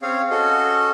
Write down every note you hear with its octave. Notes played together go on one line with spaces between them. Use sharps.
C4 C#4 G#4 C#5 F5
C#4 F#4 A4 D#5